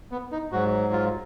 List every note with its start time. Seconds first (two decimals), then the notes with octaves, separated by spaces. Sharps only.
0.11 B3
0.32 D#4
0.52 G#2 F#3 F#4
0.93 F4